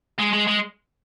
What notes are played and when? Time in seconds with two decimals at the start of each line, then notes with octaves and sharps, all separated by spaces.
0.19 G#3
0.33 G#3
0.48 G#3